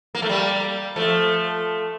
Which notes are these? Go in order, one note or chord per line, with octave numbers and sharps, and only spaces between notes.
A#3
A3
G3 A#3
F3 A3